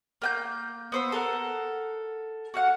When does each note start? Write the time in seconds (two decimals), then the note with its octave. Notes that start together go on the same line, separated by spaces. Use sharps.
0.22 A#3 G5 G6
0.92 B3 C5 E6
1.12 A4 A#4 F#5
2.54 F#4 F5 F#5